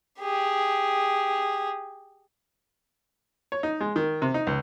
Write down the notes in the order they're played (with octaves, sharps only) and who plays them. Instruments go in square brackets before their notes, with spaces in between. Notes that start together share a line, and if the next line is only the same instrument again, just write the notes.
[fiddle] G4 G#4
[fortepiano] C#5
D#4
G#3
D#3
C3
D#4
C#2